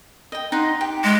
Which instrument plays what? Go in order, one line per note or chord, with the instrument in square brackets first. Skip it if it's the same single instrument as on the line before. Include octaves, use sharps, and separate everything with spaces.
[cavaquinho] D#5 G5
D#4 F#5 C6
G4
[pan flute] G#3